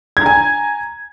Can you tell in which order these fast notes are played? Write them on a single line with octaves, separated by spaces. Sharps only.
G#6 A#5 G#5